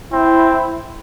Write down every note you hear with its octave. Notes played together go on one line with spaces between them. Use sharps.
C4 E4